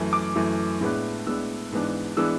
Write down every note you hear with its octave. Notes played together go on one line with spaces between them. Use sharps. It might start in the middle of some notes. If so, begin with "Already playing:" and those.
Already playing: F#2 E3 A3
D6
F#2 E3 A3
A2 G#3 B3 D4
A2 G#3 B3 D4 E6
G#2 E3 G#3 B3 D4
E3 G#3 B3 D4 E6